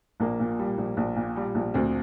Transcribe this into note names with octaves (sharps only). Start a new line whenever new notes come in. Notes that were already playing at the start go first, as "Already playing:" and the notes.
A#1 A#3
A#2
G3
A#1
A#1
A#2
G3
A#1
D2 C4